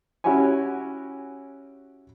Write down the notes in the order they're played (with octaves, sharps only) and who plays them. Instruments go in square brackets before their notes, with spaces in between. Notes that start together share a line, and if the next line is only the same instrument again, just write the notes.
[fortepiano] C#4 E4 F#4 G4 C#5 G#5